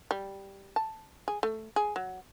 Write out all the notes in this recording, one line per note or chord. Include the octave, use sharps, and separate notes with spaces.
G3
A5
G#4
A3
G#4
F#3